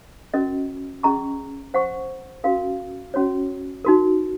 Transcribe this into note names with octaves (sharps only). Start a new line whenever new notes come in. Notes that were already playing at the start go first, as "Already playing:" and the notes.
C#4 F#4 A#4 D#5
C#4 G#4 D#5 A#5 C#6
C5 F#5 C#6
C#4 F#4 A#4 F5
C#4 F#4 C#5
D#4 F#4 A#4